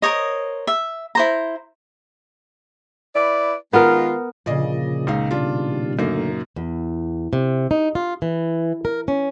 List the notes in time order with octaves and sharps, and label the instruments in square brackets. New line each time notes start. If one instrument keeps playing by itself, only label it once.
[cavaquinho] A#4 C5 C#5 D#5
E5
E4 C5 A#5
[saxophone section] E4 B4 D5
[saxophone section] D#3 G#3 F4 [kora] B3 A#4
[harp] A#2 C#3 [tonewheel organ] F3 [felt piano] D5 D#5
[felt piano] C#2 D#4 F5
[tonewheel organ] B2 D#3 G3 [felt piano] D4 F4
[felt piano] F#2 A#3 D#4 [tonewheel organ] D3 A3
[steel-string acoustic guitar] E2
C3
D#4
F4
E3
A#4
C#4